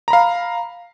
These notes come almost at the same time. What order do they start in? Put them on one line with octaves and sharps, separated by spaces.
A#5 B5 F5